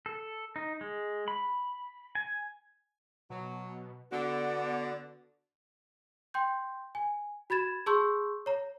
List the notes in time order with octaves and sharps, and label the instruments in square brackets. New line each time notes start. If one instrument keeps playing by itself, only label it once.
[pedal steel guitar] A4
D#4
G#3
B5
G#5
[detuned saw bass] B2 [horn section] F#3
[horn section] D3 [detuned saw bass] B3 [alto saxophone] F#4 [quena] D5
[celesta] G5 C6 G6
G#5
F#4 B5 G#6 A6 E7
G#4 A5 C6 C#6 E6 G6
C#5 A#5